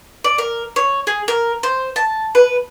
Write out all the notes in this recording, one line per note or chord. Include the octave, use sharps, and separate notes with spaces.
D5
A#4
C#5
G#4
A#4
C5
A5
B4